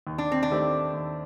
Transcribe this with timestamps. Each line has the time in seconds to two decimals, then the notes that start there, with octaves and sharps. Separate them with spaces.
0.07 D#2
0.18 D4
0.32 C4
0.43 D4
0.50 D#3 A3 C4 G4
0.93 D#2